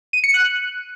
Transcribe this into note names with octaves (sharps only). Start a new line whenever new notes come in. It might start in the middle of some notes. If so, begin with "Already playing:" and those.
D#7
C#7
F#6